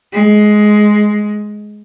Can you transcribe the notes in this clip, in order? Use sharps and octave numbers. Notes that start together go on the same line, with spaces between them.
G#3